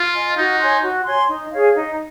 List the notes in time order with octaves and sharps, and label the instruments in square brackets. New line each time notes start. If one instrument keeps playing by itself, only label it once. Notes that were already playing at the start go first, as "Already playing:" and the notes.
Already playing: [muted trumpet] F4
[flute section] D#5 G#5
[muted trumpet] D#4 [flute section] F#4
[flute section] C#5 G#5 C6
F#4
C#5 G#5 C6
D#4
G#4 C#5 F5
D#4